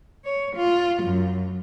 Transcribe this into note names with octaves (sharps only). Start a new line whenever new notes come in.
C#5
F4
F#2